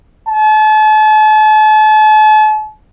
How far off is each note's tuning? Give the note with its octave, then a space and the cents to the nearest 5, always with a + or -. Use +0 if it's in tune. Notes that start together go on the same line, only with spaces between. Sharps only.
A5 -40